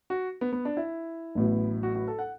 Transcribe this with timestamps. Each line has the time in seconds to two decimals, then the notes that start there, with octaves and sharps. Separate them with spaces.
0.10 F#4
0.41 B3
0.53 B3
0.65 D4
0.77 E4
1.35 A1 A2 F#3 B3
1.83 F#4
1.95 F#4
2.08 A4
2.19 F#5